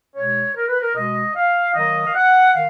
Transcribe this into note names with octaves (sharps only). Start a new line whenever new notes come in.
B2 G#3 C#5
A#4
B4
A#4
B2 G#3 D#5
F5
D#3 F#3 A#3 D#5
F5
F#5
D#3 F5